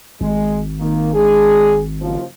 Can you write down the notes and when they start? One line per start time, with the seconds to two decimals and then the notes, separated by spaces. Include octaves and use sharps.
0.21 G#1 G#3
0.80 D#3 A#3
1.13 G#3 D4 G#4
2.00 F#1 D#2 F3